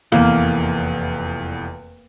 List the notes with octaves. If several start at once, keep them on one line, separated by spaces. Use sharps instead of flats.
F1 E2 E3 A#3